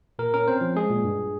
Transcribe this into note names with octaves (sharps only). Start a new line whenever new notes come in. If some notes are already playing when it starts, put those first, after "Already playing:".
A#2 A#4
C#4 A#4
C4 C5
F3
G#3 G#4
A#2
G2